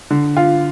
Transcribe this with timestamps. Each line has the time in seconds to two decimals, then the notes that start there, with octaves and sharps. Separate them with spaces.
0.11 D3
0.37 F4